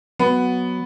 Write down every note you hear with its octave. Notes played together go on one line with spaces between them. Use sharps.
F#3 B3